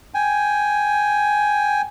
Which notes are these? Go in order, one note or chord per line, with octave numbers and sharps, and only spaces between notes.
G5 G#5